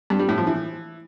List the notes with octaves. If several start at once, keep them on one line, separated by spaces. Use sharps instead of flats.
G2
G3
A2
F3
E3